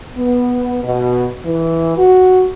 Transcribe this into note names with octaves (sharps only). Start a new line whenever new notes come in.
B3
B2
E3
F#4